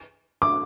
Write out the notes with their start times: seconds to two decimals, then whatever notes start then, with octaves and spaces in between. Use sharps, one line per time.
0.42 D6